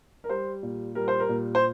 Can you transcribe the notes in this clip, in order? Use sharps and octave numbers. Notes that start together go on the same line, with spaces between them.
A#4
G3 C5
A#2
G3 A#4
C5
A#4
A#2
C5